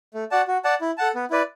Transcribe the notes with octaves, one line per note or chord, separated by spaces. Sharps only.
A3
F#4 D5 F#5 A5
F#4
D5 F#5 A5
E4
A4 F#5 A5
B3
E4 B4 D5